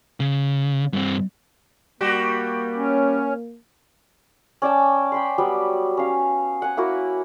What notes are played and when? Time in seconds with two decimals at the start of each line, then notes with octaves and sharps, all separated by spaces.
0.20 C#3
0.93 G2 C4
2.01 G3 A#3 F#4 G4
2.76 C#4
4.62 C#4 D5 G5 A5
5.12 G5 B5 C6
5.38 F#3 G3 B3
5.97 C#4 F5
6.62 F#5 G#5
6.77 A#3 E4 F#4 A#4